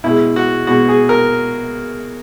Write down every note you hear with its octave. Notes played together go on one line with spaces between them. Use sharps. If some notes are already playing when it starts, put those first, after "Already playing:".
B2 G#3 E4
F#4
B2 G#3 F#4
G#4
A#4